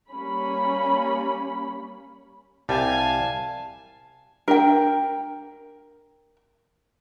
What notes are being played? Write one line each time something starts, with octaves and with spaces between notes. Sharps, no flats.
G3 A#3 C#4 B5
C2 G3 F5 G#5 A5
D4 A#4 G5